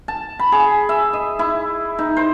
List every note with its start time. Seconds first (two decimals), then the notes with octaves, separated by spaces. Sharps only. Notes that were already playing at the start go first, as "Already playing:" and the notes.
0.08 A5
0.39 B5
0.52 G#4
0.89 E5
1.13 D#5
1.39 E4
1.99 D#4
2.17 C5